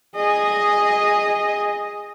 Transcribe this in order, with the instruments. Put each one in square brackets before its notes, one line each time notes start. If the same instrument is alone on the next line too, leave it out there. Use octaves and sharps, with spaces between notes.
[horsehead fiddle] G#4 D#5